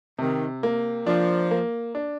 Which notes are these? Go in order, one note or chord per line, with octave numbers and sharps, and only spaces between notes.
C3 D#3
A#3
F3 D4
A#3
D4